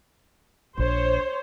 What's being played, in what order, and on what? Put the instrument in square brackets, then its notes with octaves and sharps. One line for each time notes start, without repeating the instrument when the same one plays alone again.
[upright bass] A#1 [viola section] C5 C#5